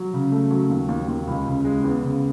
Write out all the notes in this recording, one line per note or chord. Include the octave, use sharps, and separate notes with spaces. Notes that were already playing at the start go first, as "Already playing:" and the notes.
Already playing: F#3
C#3
A3
F#3
D#2
D#2
D#2
C#2
C#3
G#3
E2
C#3